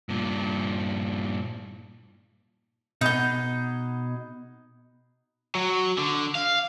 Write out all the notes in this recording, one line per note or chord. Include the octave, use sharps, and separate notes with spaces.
G2 A#2
B2 B3 D#4 G#4 G6
F#3
D3
F5